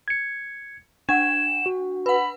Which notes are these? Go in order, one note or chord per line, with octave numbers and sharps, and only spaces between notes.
G#6 C#7
D4 F#5 G#6 E7
F#4
B4 F#5 B5